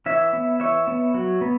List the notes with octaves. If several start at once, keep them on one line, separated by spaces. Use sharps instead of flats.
E3 C#5 E5
B3
E3 C#5 E5
B3
F#3
B3